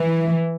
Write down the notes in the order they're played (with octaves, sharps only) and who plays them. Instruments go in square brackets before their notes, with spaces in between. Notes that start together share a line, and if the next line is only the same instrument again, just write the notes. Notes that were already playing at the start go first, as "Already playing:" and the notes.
Already playing: [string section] E3